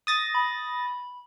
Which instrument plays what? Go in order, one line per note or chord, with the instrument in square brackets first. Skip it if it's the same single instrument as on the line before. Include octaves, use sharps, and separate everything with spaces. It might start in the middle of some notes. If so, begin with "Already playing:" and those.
[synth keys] D#6 A6 A#6
[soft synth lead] B5